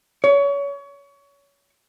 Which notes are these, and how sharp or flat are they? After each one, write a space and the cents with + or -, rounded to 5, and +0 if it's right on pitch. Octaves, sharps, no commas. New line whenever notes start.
C#5 +25